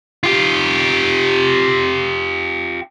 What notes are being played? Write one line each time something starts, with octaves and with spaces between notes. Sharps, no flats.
F4 G4